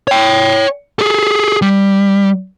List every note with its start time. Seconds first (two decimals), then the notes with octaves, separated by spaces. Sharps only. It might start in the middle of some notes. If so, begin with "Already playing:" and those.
0.08 C#5 G5
0.99 G#4 A4
1.62 G3